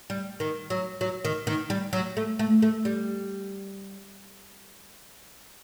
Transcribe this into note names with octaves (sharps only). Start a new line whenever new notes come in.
G3
D#3
F#3
F#3
D#3
D#3
G3
F#3
A3
A3
A3
G3